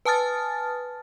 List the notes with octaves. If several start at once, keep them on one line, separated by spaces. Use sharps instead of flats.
B4 G#5 A5 D#6 F6 A6